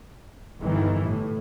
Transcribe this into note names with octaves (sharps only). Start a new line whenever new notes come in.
G1 D#3 E3
A2